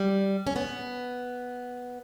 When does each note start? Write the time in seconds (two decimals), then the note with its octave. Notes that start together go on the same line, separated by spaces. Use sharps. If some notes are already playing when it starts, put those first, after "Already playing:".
Already playing: G3
0.47 C#4
0.56 B3